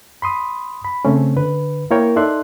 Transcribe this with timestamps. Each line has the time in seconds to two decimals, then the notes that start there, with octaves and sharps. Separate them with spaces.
0.22 B5 C6 D#6
0.85 B5
1.05 C#3 A3 C4 C#4
1.36 D3 B4
1.91 A#3 E4 A#4 C#5 G5 A#5
2.16 D#4 A4 D5 E5 C6 F#6